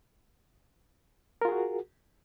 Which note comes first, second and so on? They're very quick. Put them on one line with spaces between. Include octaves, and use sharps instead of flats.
A#4 F4 G#4 F#4